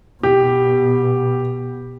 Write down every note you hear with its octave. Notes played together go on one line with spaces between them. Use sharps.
B2 G4